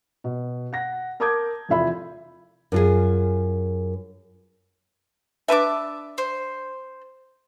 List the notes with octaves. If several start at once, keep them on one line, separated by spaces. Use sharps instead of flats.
B2
F#5 A#6
A#4 A5 D6 D#6 G6 G#6
F1 E2 F4 E5 B5
F#2 F4 G#4
D4 B4 E5 A5 D6
C5